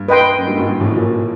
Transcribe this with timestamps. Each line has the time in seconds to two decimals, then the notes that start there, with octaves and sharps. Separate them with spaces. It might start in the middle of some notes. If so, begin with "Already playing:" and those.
Already playing: G2
0.08 B4 D#5 G5 C6
0.38 F#2
0.47 G2
0.57 G#1 G#2
0.67 G2
0.80 A1 A2
0.96 A#1 A#2